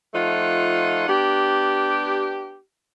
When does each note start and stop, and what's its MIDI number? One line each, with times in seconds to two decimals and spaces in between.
0.14 1.06 53
0.14 1.06 57
0.14 1.06 63
0.14 1.06 65
0.14 1.06 78
1.08 2.56 59
1.08 2.56 62
1.08 2.56 67